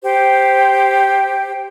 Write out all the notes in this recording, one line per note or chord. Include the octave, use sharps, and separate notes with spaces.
G4 C5 G5